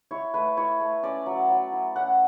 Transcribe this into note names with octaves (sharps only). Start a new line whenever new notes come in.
E4 C#5
A3 B4
E4 C#5
A3
C#4 D5
F#3
F#3
E4
C#4 F#5